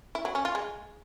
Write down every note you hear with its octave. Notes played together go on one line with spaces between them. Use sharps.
E4
F#3
C#4
F4
G#3